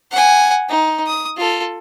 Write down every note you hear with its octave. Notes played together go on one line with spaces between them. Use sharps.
F#5 G#5
D#4
D#6
F4 A4